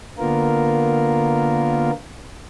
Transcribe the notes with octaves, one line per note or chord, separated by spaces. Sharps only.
D3 A#3 B3 F4 A#4